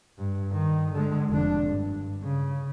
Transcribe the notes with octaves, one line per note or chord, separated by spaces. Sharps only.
G2
D#3
D3 G#3
F1 D4
G2
C#3